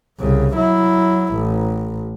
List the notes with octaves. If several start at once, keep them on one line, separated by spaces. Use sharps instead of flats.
C2 C#3
F#3 E4
A1